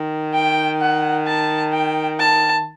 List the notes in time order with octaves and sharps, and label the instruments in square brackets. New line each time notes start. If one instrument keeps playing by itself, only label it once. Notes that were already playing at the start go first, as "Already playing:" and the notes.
Already playing: [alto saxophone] D#3
[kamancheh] G5
F#5
A5
G5
A5